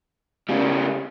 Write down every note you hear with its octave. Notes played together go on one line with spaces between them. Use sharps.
C#3 G3